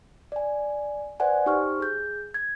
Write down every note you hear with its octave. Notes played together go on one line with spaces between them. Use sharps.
D5 G#5
B4 C5 D5 F#5 G#5
D#4 G4 C5 C#6 F6
G#4 G6
G#6